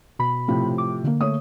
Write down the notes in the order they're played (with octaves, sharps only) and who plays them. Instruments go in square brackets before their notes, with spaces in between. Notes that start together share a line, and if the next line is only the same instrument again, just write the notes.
[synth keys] B2 B5
[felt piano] A2 C3 F3
[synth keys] D6
D3 A#3
[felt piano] A3 C#5 D#6